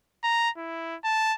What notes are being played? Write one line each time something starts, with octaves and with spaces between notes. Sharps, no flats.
A#5
E4
A5